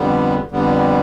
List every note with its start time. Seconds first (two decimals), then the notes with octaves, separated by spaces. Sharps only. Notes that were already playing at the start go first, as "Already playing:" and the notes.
Already playing: F2 D3 G3 B3
0.51 F2 D3 G3 B3